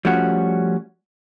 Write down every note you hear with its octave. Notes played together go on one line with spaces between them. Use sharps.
F3 G3 A3 C#4 F#4